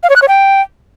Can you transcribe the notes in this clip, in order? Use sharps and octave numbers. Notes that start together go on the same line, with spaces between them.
F5
C#5
F#6
C#5
G5